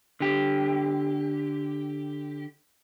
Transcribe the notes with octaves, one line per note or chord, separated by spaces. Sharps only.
D3 G4